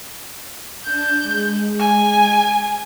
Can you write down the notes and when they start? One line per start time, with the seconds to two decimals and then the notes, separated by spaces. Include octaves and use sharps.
0.85 D4 A5 G6
1.22 G#3
1.80 G#5